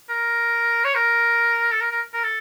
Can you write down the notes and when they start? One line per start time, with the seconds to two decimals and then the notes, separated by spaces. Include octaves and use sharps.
0.09 A#4
0.85 C#5
0.95 A#4
1.72 A4
1.81 A#4
1.91 A#4
2.14 A#4
2.24 A4